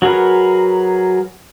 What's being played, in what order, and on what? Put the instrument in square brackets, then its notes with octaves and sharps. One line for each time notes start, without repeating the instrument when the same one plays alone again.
[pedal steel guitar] F#3 F#4 G#4 A#4 B4